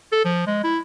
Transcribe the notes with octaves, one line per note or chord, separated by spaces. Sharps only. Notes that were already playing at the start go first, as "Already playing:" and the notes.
A4
F3
G#3
E4